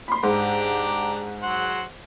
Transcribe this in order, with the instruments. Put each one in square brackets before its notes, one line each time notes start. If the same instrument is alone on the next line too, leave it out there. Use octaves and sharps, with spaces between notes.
[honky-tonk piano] B5 C6
[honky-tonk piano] G#2 [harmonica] D4 G4 A#5
[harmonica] F#3 C5 F#5